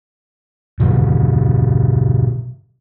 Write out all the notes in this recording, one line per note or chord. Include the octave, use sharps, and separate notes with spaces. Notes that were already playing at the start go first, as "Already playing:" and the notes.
B2 D3 F#3